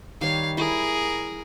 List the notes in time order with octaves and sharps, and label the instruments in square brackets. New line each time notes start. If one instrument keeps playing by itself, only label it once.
[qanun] D#3 G3 C#5 [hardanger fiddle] F5
[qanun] E4 [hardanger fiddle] G#4 A#4